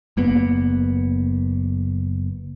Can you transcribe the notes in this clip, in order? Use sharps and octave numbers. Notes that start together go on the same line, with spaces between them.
F#1 A#3 B3